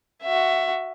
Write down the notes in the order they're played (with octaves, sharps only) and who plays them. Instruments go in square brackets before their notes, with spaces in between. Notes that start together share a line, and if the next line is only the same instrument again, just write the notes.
[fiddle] F#4 E5